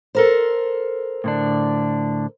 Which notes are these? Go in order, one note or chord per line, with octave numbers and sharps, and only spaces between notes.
A4 A#4 C5
A2 D3 D4